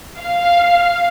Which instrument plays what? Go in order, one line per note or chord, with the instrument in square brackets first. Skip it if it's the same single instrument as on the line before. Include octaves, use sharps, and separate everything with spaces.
[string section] F5